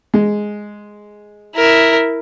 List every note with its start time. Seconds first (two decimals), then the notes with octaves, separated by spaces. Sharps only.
0.14 G#3
1.56 E4 A#4